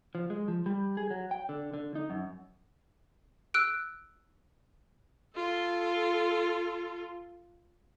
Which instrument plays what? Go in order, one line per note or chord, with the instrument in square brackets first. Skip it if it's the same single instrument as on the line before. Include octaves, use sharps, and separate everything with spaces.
[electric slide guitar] F3
G#3
F3
G3
G#4
F#3
G5
D3
D3
D#4
F#2
[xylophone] E6 F#6 D7
[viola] F4 A4